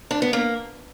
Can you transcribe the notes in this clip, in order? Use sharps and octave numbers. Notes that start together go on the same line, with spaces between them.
D4
B3
A#3